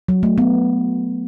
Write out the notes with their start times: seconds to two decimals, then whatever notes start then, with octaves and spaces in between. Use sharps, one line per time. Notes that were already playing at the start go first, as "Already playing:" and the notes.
0.09 F#3
0.23 A3
0.38 B3